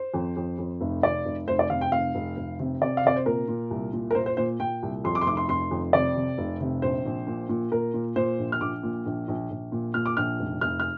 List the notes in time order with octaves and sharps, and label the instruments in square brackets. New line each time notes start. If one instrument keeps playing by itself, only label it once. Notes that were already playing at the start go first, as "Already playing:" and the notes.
Already playing: [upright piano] C5
F2
F2
F2
F1
F1 D5
F1
F1 C5
D5
C3 F5
G5
F1 F5
F1
F1
C3
C3 D5
F5
C3 D5
C5
A#2 A#4
A#2
C2
A#2
A#4
A#2 C5
C5
A#2 C5
A#2 G5
C2
F2 C6
D6
C6
F1 D6
C6
F1 C6
F2
C3 D5
C3
F1
C3
A#1 C5
A#1
A#2
A#2
A#2 A#4
A#2
A#2 C5
A#1
F6
A#1 D6
A#2
A#1
A#1
A#1
A#2
A#2 F6
D6
A#1 F6
F1
F1 F6
F6